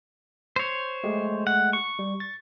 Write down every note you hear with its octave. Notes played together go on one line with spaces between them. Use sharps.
C5 C#5
G#3 A3 G4
F#5
C#6
G3
A6